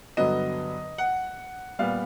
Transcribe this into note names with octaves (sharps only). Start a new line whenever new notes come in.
G2 D3 F#3 B3 D#5
F#5
A#2 G3 B3 F5